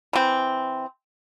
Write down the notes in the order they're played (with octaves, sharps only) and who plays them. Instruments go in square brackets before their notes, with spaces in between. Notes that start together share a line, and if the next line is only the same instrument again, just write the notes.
[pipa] E3 C4